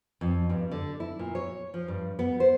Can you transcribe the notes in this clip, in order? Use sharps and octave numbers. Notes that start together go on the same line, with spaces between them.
F2
G2
D3
E4
A#2
C#5
F3
G2
B3
C5